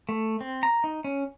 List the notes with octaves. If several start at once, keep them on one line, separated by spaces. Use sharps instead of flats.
A3
C4
A#5
D#4
C#4